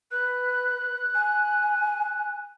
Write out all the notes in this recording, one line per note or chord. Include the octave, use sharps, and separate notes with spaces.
B4 F#6
G#5